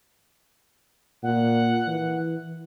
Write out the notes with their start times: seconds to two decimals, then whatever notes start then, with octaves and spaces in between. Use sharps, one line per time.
1.23 A#2 F#5
1.88 E3